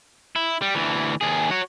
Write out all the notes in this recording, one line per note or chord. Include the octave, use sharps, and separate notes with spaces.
E4
G3
D2 E3
D#2 G#4
F#4 C#5